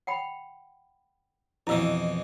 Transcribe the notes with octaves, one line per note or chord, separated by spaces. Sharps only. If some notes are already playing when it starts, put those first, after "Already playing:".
F#5 G5 B5
F2 B2 E3 E4 F5 E6